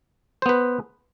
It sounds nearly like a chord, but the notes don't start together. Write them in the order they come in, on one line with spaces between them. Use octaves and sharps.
C5 B3 B4